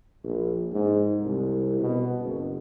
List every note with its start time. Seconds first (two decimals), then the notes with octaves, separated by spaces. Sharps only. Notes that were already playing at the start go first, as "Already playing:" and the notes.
0.24 A#1
0.72 G#2
1.22 C2
1.79 B2
2.21 F#1